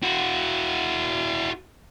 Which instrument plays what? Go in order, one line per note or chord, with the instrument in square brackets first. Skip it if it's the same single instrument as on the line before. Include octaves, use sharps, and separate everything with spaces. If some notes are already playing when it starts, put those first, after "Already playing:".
[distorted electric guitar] E4 F#4